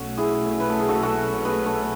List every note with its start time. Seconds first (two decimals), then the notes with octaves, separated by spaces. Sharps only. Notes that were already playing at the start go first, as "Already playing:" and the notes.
Already playing: B1 B2 A3 C#4 F#4
0.18 E4 G#4
0.60 B4
0.70 A4
0.80 G#4
0.89 F#4 A4
1.02 F#4 A4
1.45 G#4 B4
1.66 A4 C#5